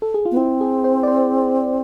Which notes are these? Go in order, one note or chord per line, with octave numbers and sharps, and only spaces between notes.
A4
G#4
F4
B3
C4 E4
G#4
C5
D5
C5